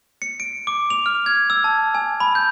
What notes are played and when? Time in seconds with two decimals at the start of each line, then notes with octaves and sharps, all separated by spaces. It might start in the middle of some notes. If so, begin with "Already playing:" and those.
0.22 C#7
0.40 D7
0.67 D6
0.90 F7
1.06 F6
1.26 G#6
1.50 E6
1.64 A5
1.95 G#5
2.20 B5
2.35 G6